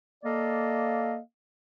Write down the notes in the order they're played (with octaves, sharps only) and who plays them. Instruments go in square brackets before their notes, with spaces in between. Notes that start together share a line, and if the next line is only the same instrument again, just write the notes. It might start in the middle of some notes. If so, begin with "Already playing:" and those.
[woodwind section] A#3 A4 D5 D#5 F5